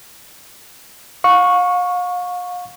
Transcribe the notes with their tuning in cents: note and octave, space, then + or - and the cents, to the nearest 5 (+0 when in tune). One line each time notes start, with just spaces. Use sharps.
F5 +40 C#6 -5